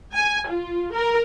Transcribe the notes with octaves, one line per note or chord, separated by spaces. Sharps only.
G#5
F4
A#4